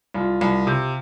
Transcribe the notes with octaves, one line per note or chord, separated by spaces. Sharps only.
C2 F4
C2
C3